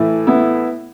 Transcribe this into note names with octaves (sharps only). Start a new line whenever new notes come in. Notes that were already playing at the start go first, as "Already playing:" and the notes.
Already playing: A2 E3 A3
B3 E4